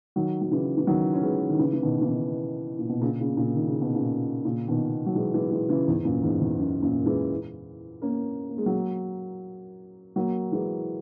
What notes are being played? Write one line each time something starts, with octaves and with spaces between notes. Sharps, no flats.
D#3 F#3
F#3
C#3 E3
E3
D#3 F#3
C#4
G#3 B3
D#3
C#3 E3
E3
B2 D#3
E3
B2 D#3
A#2
B2
A#2 C#3
A#2 C#3
A#2 C#3
D#3
C#3
B2
A#2 C#3
A#2 C#3
B2 D#3
F#3
E3 G#3
E3 G#3
E3 G#3
C#3 E3
E2 G#2
F#2 A#2
E2 G#2
E2
F#2
F#2 A#2
E3 G#3
A#3 C#4
A#3
G#3
F#3 A#3
F#3 A#3
E3 G#3